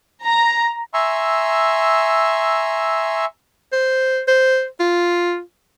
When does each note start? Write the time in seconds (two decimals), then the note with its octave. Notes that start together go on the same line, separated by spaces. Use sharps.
0.25 A#5
0.94 E5 G#5 A#5 C6 C#6 E6
3.73 C5
4.28 C5
4.80 F4